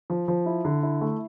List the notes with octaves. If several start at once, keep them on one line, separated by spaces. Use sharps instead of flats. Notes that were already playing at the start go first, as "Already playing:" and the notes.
F3
F3
E4
D3
E4
A3